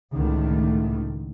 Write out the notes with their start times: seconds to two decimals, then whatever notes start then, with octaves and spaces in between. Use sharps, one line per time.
0.14 C#2 A2 D3 D#3 A3